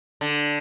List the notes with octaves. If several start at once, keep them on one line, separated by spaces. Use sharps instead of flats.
D3